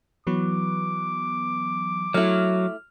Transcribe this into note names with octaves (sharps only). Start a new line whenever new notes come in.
E3 F#3 B3 D6
F#3 A3 E4 F6